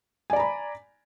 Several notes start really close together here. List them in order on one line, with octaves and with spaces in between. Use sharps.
G#5 D5 A#5 B5